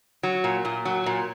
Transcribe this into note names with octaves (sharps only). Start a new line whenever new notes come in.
F#3
A#2
A#2
F#3
A#2